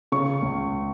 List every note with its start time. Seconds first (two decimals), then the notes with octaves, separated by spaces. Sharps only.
0.12 C#3 C#6
0.42 C#2